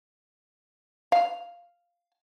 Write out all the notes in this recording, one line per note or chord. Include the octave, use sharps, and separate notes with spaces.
F5